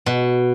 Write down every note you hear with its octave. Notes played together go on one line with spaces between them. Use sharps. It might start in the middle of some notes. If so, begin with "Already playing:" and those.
B2